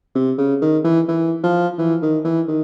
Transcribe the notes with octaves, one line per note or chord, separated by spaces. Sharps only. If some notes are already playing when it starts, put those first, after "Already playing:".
C3
C#3
D#3
E3
E3
F3
E3
D#3
E3
D#3